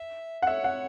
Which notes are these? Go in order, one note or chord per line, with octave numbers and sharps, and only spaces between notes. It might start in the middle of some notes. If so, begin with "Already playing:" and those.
Already playing: E5
F#5
C#5 E5
F#5